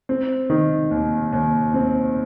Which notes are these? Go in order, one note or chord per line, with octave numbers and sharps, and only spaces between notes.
C4
D#3
D#2
D#2
C4